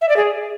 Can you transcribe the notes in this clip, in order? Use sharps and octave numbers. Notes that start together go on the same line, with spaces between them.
E5
D5
G#4